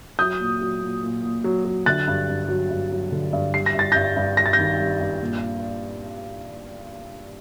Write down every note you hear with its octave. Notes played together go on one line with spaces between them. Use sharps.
F#3 D#6 G6
A#2
F#3
A#2
A#2
A#2
F#3
F#3
D3 F#6 A6
G2
G2
F#3
G2
F#3
D3
G2
G3 C7
A#6
G2 A6
G2 G6 A#6
G2
G3 A#6
A6
G6 A#6
D#3
G3
G2
A#2